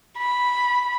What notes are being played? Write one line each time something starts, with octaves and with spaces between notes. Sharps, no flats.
B5